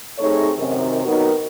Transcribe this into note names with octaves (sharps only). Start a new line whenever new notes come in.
C3 A3 D#4 G#4 C#5
F#2 C3 D#3
D#3 F#3 B3 D#4 F#4 A#4